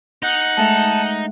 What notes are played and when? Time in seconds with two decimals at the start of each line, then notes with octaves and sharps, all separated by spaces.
0.23 D#4 F#5 F#6
0.57 G#3 A3 E5 A5